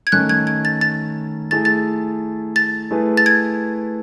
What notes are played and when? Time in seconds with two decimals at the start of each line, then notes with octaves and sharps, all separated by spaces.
0.07 G#6
0.12 D#3 A3 C#4 F#6
0.29 G#6
0.47 G#6
0.65 A6
0.81 A6
1.51 A3 E4 G#4 A6
1.65 A6
2.56 A6
2.91 A3 E4 G#4 B4
3.17 A6
3.26 G#6